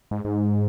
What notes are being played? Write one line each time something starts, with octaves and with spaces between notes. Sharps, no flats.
G#2
G#2